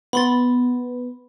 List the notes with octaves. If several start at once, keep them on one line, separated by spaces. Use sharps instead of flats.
B3 B5 C6 A6